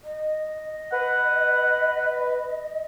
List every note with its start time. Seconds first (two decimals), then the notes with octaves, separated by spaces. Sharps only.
0.04 D#5
0.92 B4 F#5